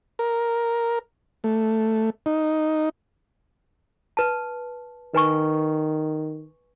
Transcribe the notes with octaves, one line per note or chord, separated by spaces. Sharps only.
A#4
A3
D#4
B4 A5
D#3 B4 G#5 C#6